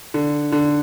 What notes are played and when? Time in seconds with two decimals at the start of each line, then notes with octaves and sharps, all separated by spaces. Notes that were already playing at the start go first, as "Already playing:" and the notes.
0.14 D3
0.52 D3